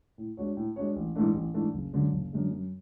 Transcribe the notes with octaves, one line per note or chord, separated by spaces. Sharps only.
A2
G#3 D4 F#4 C#5
A2
G#3 D4 F#4 C#5
A1
G#2 E3 A3 D4
A1
G#2 E3 A3 D4
F#1
F#2 D3 G#3 D4
F#1
F#2 D3 G#3 D4
F#2